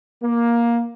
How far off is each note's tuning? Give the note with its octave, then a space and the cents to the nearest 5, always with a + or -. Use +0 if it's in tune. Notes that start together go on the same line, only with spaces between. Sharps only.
A#3 +10